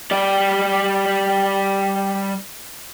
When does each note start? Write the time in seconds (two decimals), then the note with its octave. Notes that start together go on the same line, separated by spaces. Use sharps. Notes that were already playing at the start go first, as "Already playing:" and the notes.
0.11 G3 D5